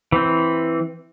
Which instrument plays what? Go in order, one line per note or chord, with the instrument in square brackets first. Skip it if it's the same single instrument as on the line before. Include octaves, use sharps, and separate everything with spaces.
[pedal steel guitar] E3 C4